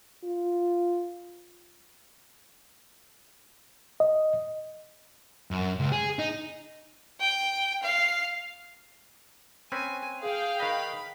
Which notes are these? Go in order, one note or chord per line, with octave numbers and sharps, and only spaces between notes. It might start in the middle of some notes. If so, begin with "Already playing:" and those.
F4
D#5
F#2
C#2
G#4
D#4
G5
F5
C4 C#4 B4 G#5
G#4 F5 G5
D#3 B4 D#5 B5